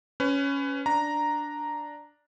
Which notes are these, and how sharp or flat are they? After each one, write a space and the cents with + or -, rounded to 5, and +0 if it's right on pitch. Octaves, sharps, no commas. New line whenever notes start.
C#4 +5 B4 +25
D4 +0 A#5 +0